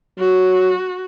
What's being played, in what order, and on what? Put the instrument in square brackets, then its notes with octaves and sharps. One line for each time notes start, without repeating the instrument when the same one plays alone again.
[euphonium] F#3 [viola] F#4